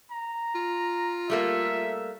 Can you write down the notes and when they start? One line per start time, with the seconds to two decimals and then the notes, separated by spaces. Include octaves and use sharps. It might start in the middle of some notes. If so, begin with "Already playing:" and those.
0.11 A#5
0.55 F4
1.30 G3 A3 A#3 E5